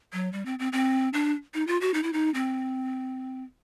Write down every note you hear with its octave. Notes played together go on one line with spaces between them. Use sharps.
F#3
G3
C4
C4
C4
D4
D#4
F4
F#4
D#4
E4
D#4
C4